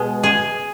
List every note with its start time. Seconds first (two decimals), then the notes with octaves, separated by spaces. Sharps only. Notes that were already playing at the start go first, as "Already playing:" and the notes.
Already playing: B2 G#3
0.23 G#4